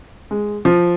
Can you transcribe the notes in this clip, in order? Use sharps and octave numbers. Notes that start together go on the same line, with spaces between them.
G#3
F3